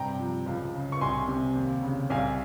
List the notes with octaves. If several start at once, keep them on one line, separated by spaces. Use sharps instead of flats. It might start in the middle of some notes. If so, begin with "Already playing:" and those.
Already playing: G2 C3 G5 A#5
F3
C#2
C#3
C#6
C2 G#5 C6
C3
D#2
C#3
C2 F5 G#5